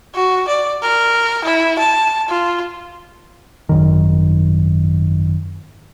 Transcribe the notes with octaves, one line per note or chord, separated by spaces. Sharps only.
F#4
D5
A#4
E4
A5
F4
G#1 F#2 D#3